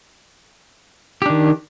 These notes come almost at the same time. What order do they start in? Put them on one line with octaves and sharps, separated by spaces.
G4 D4 D#3